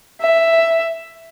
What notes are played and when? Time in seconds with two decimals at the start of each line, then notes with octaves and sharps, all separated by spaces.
0.21 E5